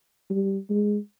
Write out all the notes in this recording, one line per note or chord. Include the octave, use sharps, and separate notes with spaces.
G3
G#3